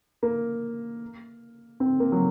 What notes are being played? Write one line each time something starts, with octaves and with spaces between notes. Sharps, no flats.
A#3
C4
A#3
F#3